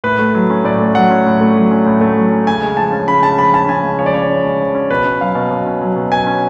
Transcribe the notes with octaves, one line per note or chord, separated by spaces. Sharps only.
A2 B4
A3
F#3
C#4
A2 D5
A3
F#3 F#5
C#4
A2
A3
F#3
C#4
A2
A3
F#3
C#4
C#3 G#5
G#3
F3 A5
C#4
C#3 B5
G#3 A5
F3 B5
C#4 A5
C#3 G#5
G#3
F3 C#5
D5
C#4 C#5
C#3
G#3
F3
C#4
B2 B4
C#4
F#3 F5
B2
B2
C#4
F#3
B2
B2 G#5
C#4